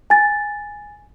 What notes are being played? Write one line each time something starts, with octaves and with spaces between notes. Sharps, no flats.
G#5 A6